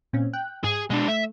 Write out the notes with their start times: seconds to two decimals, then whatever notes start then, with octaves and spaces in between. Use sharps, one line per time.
0.13 A#2 C4 C#4
0.33 G5 F#6
0.64 G#2 G#4
0.90 B2 G#3 D4
1.08 A3 E5